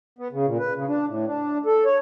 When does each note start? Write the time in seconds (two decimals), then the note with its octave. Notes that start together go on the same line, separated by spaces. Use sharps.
0.19 B3
0.32 C#3
0.46 A#2
0.59 B4
0.76 C#3
0.88 D4
1.08 A2
1.27 D4
1.66 A4
1.85 C#5